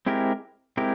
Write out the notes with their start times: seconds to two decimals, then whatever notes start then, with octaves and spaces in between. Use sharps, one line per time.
0.06 G#3 C4 E4 G4 A#4
0.77 G#3 C4 E4 G4 A#4